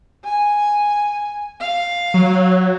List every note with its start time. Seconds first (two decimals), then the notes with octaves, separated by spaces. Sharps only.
0.25 G#5
1.61 F5
2.14 F#3